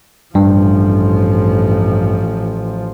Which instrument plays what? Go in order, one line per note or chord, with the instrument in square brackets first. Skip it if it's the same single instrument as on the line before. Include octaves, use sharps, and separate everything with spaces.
[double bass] A1 F3 [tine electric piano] G2